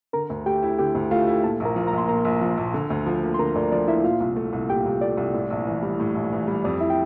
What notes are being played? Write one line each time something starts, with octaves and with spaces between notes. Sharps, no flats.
D3 A#4 A#5
D2
A3 G4 G5
E4
D3 G4 G5
D2
A3 F4 F5
E4
A#2 A4 A5
A#1
A#4 A#5
F3
A#4 A#5
A#1
C6
A#2 A#4 A#5
A#1
F3
A#1
D3
D2
F3
A#3
C6
D3 A#4 A#5
D2 D5
F3 D5
A#3 E4 E5
A#2 F4 F5
C2
A3
C2
A#2 G4 G5
C2
A3 D5
C2
A2
A#1
E3
G3
A2
A#1
E3
G3
F2 D5
E4 E5
G5